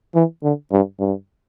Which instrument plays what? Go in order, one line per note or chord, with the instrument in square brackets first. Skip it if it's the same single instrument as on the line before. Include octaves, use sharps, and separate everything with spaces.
[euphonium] E3
D3
G2
G2